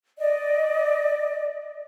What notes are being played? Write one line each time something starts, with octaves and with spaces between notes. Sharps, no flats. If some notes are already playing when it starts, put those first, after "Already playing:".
D5 D#5